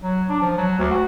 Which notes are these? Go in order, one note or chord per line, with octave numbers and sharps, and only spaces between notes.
F#3
D4
F3
F#3
D2
F#4